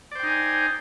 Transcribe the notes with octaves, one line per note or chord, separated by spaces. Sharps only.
D#4 C5 D5 G5 G#5